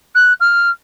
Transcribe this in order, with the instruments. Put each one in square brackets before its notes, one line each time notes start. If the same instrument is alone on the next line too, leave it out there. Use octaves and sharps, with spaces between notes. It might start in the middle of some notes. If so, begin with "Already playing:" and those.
[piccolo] F#6
F6